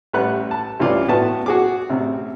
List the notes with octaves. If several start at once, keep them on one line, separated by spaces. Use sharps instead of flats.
A1 G3 B4 F#5 F#6
A5
C2 G2 E3 C#4 F4 D5
A2 B3 F#4 A5
F#4 G#4 D6
A1 C3